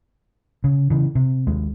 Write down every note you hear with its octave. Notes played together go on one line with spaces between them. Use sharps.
C#3
C#3 E3
C3
D#2 G#3